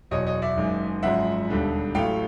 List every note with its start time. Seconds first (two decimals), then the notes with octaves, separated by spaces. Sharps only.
0.11 F#1 E2 B2 F#3 C#5 D#5
0.26 C#5 D#5
0.42 D5 E5
0.57 F#1 F#2 D#3 G#3
1.03 G#1 F#2 C#3 F3 G#3 E5 F#5
1.49 E1 D#2 D3 G3
1.94 A1 A2 F#3 A3 F5 G5